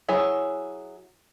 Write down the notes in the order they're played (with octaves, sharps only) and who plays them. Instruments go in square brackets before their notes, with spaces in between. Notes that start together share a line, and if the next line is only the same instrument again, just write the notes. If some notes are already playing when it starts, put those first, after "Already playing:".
[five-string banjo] F#3 E4 G#4 C#5